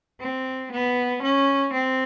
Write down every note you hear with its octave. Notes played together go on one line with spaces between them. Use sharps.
C4
B3
C#4
C4